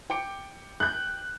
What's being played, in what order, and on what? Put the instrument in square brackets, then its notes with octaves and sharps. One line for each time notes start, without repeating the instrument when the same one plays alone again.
[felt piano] G5 D6 C#7
[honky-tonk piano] F#6 G6